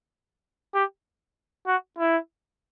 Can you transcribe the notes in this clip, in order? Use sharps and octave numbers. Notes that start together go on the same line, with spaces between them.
G4
F#4
E4